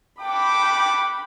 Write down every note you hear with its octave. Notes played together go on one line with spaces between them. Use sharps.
F#5 G5 A5 B5 D6